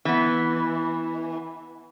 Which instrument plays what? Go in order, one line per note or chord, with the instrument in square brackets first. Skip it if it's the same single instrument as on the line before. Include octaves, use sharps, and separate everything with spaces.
[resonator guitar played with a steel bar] E3 B3